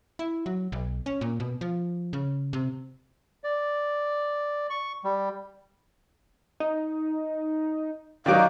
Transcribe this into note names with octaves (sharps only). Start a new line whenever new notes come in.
E4
F#3
B1
C#4
A#2
B2
F3
C#3
C3
D5
C#6
G3
D#4
D#3 F#3 D#4 D5 F5 D6